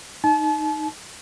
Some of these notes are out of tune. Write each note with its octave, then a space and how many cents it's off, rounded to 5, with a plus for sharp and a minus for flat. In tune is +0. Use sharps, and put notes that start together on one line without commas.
D#4 -5 A5 -40